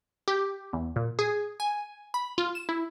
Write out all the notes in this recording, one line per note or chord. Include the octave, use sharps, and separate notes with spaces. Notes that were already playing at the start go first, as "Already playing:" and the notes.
G4
E2
A#2
G#4
G#5
B5
F4
E7
E4